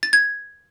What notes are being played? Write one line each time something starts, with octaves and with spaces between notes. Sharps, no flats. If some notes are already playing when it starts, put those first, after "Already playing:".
A6
G#6